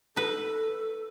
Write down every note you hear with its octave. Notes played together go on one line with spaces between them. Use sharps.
D#4 A4 B4